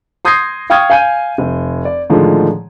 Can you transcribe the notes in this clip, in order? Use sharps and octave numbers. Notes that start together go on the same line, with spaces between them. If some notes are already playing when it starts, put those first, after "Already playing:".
C6 D#6 G6 G#6 A#6 C7
F5 G5 C#6 D#6 F6 G#6
F5 G#5 G6 D#7
F1
D5
A2 D3 D#3 F3 G#3